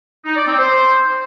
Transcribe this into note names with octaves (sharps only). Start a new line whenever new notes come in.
D#4
D5
C4
C5